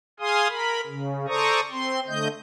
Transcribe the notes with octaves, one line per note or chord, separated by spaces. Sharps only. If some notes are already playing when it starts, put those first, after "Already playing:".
G#4 F5 G#5 C6 D#6
A#4 B5
C#3
A4 C5 D5 A#5 C#6 D#6
C4 C6
D3 A3 D#5 G6